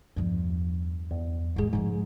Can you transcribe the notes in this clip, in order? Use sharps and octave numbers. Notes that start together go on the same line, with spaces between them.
E2 G2 F3
E2
A1 G#2 G#3 G#4
G#2 C#3 F3